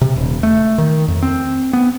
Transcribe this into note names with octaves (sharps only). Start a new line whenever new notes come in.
C3
D#1
A3
D#3
F2
C4
B3